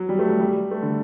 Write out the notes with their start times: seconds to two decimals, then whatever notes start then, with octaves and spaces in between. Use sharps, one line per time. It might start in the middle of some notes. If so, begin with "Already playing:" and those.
Already playing: F#3
0.09 G3
0.19 A3
0.29 G3
0.40 G3
0.71 A3
0.82 D3